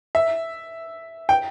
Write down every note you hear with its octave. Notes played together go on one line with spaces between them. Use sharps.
E5
G5